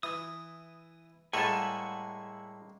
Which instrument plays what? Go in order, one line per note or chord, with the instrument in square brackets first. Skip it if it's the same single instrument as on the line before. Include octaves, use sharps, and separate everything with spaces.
[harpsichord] E3 [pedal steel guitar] D#6
[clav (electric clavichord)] A2 A4 [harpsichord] G3 G#3 A#3 [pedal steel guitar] E5 F#5 G#5